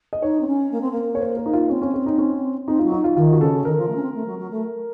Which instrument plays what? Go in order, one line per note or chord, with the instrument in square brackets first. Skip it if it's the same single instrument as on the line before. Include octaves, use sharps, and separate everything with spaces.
[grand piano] D#5
[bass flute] D#4 [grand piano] C#5
[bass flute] C4
C#4
A#3
C4
A#3
[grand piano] C#5
C5
A#4
D#4
F4
[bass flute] C4 [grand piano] C#4
[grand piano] C#4
C#4
D#4
C#4
[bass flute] C4 [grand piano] D#4
[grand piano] F4
[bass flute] F#3
[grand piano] D#4
F4
[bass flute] D#3 [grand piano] F4
[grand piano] F#4
[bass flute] C#3 [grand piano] A4
[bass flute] D#3 [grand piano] A#4
[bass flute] F3
A3
C#4
C4
A3
F#3
F#3
A3